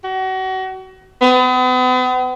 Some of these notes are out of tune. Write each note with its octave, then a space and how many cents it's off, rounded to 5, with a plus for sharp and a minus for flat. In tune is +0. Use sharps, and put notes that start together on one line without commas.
F#4 +30
B3 +40